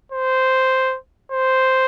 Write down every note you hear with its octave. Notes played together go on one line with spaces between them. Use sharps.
C5
C5